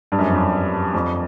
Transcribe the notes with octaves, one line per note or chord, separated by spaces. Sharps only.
G2
F#2
F2
F#2
F2